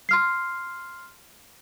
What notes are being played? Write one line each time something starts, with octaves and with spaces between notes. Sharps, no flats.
C6 F6 C7